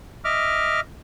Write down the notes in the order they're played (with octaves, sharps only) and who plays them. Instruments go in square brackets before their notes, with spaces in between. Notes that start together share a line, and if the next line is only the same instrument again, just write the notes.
[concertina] D#5 E5 D6 F6